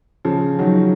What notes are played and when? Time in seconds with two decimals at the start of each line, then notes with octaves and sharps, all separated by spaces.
0.25 C#3 F3
0.59 D#3 F#3